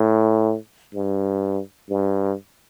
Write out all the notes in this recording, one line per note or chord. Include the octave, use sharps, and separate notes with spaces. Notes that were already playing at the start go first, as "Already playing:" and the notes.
Already playing: A2
G2
G2